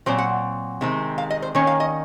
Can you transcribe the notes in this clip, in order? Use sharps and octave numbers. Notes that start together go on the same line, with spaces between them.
A#2 F#3 C4 C5
F#5
C3 D#3 G#3 C4
F5
D#5
C5
D#3 A#3 C#4 C#5
F5
D#5